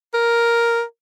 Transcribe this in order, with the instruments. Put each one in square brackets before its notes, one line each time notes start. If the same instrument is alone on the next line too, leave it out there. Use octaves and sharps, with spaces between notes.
[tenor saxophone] A#4